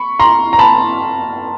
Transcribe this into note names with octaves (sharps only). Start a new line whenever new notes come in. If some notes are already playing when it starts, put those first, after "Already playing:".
Already playing: B5 C#6
A#5 C6
A#5
A5 B5